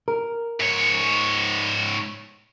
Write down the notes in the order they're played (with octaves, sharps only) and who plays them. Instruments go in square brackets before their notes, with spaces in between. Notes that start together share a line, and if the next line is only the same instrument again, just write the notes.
[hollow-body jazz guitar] A#4
[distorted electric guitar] G#2 C#5